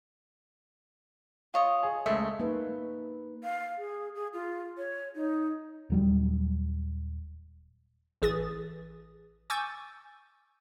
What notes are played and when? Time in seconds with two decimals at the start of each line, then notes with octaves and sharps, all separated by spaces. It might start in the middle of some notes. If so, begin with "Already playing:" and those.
1.54 F4 C#5 D#5
1.83 G#4
2.06 C#2 G#3 A3 E5
2.40 A#3 D#4 B4
3.44 F5
3.78 G#4
4.15 G#4
4.33 F4
4.78 C#5
5.15 D#4
5.90 D#1 F#3 G3
8.22 A1 E3 G#4 D#6 A6
9.50 G#5 C#6 D6 E6 G6 A6